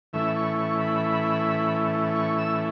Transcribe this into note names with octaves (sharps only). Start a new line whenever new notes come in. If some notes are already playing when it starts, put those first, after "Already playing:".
A2 E3 A3 C#4 E4 E5
C#6
C#6
B5
C#6
E6